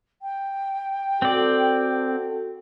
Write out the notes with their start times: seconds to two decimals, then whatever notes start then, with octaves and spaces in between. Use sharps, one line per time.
0.22 G5
1.22 C4 F#4 A4 D5